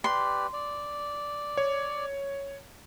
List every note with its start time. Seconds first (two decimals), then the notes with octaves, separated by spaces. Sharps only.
0.04 G4 B4 D5 C6
0.53 D5
1.57 C#5